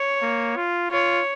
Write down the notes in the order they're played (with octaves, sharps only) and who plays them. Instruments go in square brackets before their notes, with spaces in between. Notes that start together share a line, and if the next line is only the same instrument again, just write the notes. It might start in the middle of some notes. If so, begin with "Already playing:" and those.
Already playing: [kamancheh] C#5
[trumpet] A#3
F4
[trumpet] F4 [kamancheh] C#5